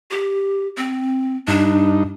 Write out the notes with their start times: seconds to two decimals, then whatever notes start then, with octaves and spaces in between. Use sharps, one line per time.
0.11 G4
0.77 C4
1.48 G2 D4 D#4